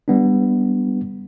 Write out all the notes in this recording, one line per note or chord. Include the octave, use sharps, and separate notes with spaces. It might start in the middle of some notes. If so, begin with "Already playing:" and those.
G3 B3 D4